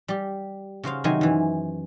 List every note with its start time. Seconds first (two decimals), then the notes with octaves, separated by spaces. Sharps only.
0.08 G3 G4
0.84 C#3 F#4 C5 F5
1.04 C3 D#3 F#3 C5 G#5
1.21 F#2 E3